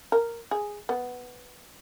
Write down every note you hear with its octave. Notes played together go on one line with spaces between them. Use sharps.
A#4
G#4
B3